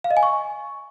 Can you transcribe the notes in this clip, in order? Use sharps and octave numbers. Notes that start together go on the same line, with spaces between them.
F5
D#5
G#5
C#6